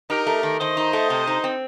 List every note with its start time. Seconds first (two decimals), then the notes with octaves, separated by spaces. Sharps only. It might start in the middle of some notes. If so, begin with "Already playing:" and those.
0.10 D#4 G4 A#4
0.27 A3
0.43 D#3
0.60 D#3 C5 D#5
0.77 D#4
0.93 A3
1.10 C3
1.27 D#4
1.44 C4